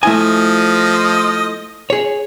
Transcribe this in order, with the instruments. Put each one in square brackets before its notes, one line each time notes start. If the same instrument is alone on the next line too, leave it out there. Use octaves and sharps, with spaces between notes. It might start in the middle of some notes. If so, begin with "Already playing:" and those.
[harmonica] F3 D#5 [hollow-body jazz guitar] A3 E4 G#5
[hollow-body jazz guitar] G#4 C#5